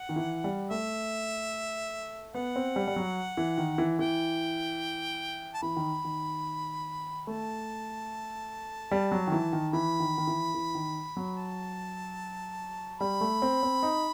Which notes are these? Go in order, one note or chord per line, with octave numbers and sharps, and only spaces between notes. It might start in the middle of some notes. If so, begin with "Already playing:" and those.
Already playing: F#5
D#3
E3
G3
A3 E5
B3 F#5
C4
G3
G3
F#3
E3
D#3
E3
E3 G5
A5
E3 B5
D#3
D#3
A3 A5
G3
F#3
D#3
E3
D#3
E3 B5
D#3
D#3
E3
E3
D#3
F#3
A5
G3 B5
A3
C4
C4
D#4